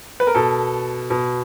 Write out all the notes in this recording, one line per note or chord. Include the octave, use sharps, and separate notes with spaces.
B4
A#4
B2 A4
B2